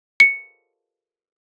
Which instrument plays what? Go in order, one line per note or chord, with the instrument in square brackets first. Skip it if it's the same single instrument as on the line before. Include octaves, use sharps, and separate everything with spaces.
[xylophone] C#7